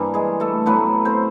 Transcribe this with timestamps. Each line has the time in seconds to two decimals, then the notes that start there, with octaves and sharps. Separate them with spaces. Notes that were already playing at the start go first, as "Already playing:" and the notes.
Already playing: G2 E3 G3 A#3
0.14 G#3 G#4
0.40 A3 A4
0.66 A2 F#3 A3 B3 B4
1.05 C4 C5